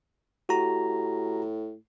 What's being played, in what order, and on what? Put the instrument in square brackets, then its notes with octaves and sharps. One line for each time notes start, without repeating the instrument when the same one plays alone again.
[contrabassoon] A2 [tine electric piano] F#4 G4 A#5